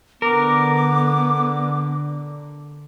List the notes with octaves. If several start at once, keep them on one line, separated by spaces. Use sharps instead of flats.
D3 B3 A#4 D6